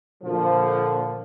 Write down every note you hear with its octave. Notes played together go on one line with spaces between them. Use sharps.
A#2 D3 F3